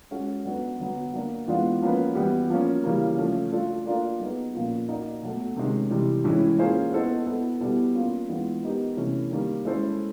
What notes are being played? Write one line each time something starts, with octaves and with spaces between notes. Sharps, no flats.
G#3 C#4 F#4 A4
F#3 B3 D4 F#4 B4
D3 F#3 B3
F#3 A#3 D4
E3 G#3 B3 D4 F4
F3 A#3 C#4 F#4 B4
E3 G3 B3 E4 G4
F3 A#3 C#4
C#3 E3 G3 A#3
F3 A3 C#4
A3 D4 F4 A4
A#3 D4 F4 A#4 D5
F#3 B3 D#4 G#4 B4
A#2 F3 A#3 C#4 F4
A#3 D#4 F#4 A#4 D5
B2 F#3 A3
C3 D#3 G#3 C#4
C3 E3 G3
A2 E3 G#3 C#4 E4
A#3 C#4 F4 G#4 C5
B3 E4 A4 C5 D#5
B3 E4 A4
B2 G3 B3 E4
A#3 C#4 F4
E3 G#3 B3 D4 F4
B3 D#4 G4 A#4
C3 E3 A3 C#4 E4
D#3 G3 A#3
G#3 C#4 E4 A4 C5